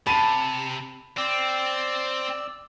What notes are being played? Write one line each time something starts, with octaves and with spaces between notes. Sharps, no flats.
C3 A5 B5 D#7
C4 D5 E6